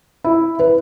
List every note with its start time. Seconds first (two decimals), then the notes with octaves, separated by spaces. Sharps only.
0.24 E4
0.59 B4